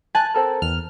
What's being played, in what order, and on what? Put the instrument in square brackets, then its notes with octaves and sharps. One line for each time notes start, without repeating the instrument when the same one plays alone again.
[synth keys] G#5 F#6 [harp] A5
[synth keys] C4 A4 A#4
E2 F6